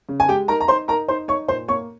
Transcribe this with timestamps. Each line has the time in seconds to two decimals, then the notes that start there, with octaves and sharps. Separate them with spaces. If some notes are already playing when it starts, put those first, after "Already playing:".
0.09 C#3
0.20 G#5
0.29 G#3 G4 G5
0.48 D#4 A#4 A#5
0.61 A#5
0.68 D#4 C5 C6
0.88 D#4 A#4 A#5
1.08 D#4 C5 C6
1.28 D#4 C#5 C#6
1.48 A#2 C5 C6
1.68 A#3 C#5 C#6